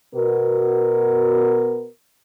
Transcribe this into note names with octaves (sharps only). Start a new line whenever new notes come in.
B2 B3 F#4 A#4